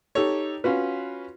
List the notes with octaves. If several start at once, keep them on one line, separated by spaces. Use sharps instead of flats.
D#4 G4 A4 C#5
C#4 F4 F#4 B4